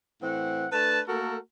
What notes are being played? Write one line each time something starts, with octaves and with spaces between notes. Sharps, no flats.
A2 E3 C4 F#5
A3 D4 B4 A5
A3 A#3 F#4 A4 A#4